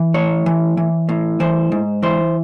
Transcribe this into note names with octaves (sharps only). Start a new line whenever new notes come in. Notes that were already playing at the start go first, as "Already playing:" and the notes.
Already playing: E3
A2 C#5
E3
E3
A2
E3 C5
G#2
E3 C5